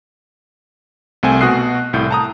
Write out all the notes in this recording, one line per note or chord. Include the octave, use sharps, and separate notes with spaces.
C2 A3 C4 G#5
B2 F#4 D#6 F#6 C7
C2 A2 G6
A5 A#5 D#6